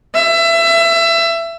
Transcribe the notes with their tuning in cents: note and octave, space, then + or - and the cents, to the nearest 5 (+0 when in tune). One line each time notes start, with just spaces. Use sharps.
E5 +25